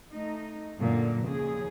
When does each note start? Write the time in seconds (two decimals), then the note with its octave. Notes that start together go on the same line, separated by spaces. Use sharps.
0.12 A3 D#4
0.78 F#2 A#2 D3
1.27 D#2 C#3 F3 G#4